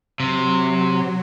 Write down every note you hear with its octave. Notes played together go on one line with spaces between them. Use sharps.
C3 F#3